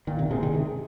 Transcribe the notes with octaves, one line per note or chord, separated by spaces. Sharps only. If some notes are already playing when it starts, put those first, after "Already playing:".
A#2 D#3
C3
C3 G#3 D#4 G#4
D#3
C3 G#3